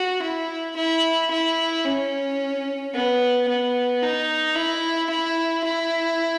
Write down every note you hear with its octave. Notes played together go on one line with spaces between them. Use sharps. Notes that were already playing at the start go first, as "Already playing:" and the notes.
Already playing: F#4
E4
E4
E4
C#4
B3
B3
D#4
E4
E4
E4